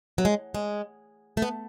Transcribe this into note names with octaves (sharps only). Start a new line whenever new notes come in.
F#3
G#3
G#3
A3
B3